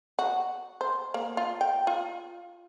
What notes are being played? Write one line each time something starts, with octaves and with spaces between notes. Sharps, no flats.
F#4
C5
A#3
F4
G5
F4